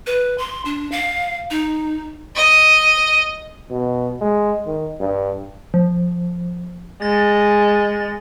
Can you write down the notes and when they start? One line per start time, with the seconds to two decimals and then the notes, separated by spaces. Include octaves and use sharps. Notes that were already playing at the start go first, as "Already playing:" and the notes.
0.07 B4
0.38 C6
0.65 D4
0.92 F5
1.51 D#4
2.36 D#5
3.71 B2
4.21 G#3
4.67 D#3
5.00 G2
5.74 F3
7.02 G#3 A6